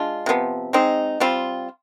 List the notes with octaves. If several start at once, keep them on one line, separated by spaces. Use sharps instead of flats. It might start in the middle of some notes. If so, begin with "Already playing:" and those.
Already playing: G#3 D4 F4
C3 F3 B3
G#3 C4 D#4
G3 C4 F4